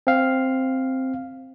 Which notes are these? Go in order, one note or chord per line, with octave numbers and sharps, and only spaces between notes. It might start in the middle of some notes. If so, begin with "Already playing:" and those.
C4 F5